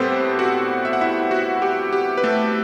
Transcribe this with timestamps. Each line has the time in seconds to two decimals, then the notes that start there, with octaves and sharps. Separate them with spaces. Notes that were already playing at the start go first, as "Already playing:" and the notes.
Already playing: A2 G3 B3 C4 G4 A4 B4 C5
0.39 F#4 F#5
0.85 E5
0.93 F#5
1.01 E4 E5
1.31 F#4
1.62 G4
1.92 G4
2.17 B4
2.24 A3 A4